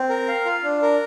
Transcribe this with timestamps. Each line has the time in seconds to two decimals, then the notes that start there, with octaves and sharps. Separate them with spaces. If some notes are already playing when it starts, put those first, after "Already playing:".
Already playing: C4
0.09 A#4
0.28 F5
0.45 F4
0.64 D4
0.82 A#4